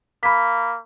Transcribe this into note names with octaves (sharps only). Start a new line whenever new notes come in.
A#3 B5 B6